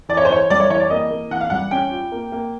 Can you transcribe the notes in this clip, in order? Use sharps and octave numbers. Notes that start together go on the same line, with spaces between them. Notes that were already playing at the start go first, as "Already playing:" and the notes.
E3 D5
C#5
C5
E3 C#5
G3 D5
C#5
E3 C#5
D5
A#3 D#5
A#3
E3 F#5
F5
G3 F#5
C#4 G5
F4
A#3
A#3